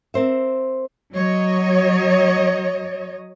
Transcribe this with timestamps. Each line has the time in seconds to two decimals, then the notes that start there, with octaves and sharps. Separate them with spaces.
0.14 C4 A#4 C5 E5
1.14 F#3 C#5 D#5